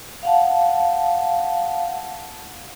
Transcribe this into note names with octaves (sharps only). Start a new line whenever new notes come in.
F5 F#5 A5